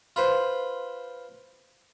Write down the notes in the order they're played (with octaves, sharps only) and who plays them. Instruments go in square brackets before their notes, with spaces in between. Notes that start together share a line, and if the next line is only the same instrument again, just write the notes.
[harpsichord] F4 B4 C5